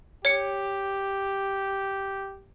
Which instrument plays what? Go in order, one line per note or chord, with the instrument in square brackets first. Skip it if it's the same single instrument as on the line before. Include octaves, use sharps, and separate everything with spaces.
[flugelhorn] G4 [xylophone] C#5 C#7